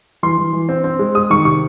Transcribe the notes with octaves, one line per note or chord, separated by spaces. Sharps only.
E3 C6
E3
E3
C4
C4
G#3
G#3 D#6
D#3 C#6
C3 C#6